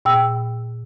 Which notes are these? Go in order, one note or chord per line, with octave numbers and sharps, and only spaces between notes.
A#2 G5 E6